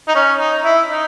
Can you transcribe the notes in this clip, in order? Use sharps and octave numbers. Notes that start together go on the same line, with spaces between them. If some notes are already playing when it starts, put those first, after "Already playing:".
D#4
C#4
D#4
E4
D#4